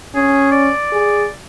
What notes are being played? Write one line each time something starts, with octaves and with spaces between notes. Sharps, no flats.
C#4 G#4
D5
G#4